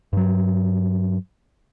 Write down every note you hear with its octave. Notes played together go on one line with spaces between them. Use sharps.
G2 F#3